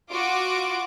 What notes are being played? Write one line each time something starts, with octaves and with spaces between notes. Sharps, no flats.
F4 F#4 D6 D7